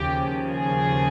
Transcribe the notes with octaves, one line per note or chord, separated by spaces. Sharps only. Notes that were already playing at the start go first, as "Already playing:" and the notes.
Already playing: D#2 C#3 F3 G4
G#4